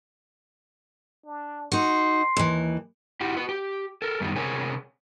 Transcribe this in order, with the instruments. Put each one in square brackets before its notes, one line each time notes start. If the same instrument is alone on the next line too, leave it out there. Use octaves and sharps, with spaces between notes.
[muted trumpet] D4
[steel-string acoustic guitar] D#4 F#4 [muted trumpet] C6
[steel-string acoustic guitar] D#2 E3
[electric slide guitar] E4 F#4 G4
F#4 B4
G4
A4 A#4
F#2 D#3 G3 B3
C3 G#4 A#4 C#5 G#5